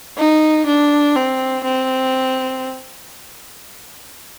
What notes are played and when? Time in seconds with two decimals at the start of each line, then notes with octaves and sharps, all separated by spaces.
0.17 D#4
0.66 D4
1.15 C4
1.64 C4